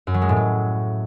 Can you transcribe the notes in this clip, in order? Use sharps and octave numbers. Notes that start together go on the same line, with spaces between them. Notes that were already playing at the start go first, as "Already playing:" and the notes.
F#2
F#3
G#3
A2
F#3